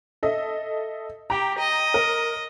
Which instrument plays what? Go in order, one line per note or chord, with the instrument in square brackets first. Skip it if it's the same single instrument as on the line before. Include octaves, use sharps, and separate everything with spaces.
[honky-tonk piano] A4 D#5 E5
[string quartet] G4 [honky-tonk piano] G5 A#5
[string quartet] D#5
[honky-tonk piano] A#4